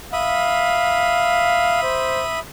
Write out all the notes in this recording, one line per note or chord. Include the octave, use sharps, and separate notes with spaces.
E5 F5 B5 D#6
C5